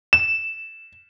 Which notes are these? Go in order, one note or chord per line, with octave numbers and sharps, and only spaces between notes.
E7